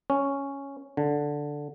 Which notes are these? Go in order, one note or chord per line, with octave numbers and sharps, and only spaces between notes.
C#4
D3